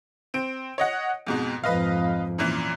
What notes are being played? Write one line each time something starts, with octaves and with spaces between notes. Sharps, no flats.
C4 D7
C#5 D#5 F#5
F2 G#2 B2
F2 G#2 B4 D#5 F5
F#2 A#2 E3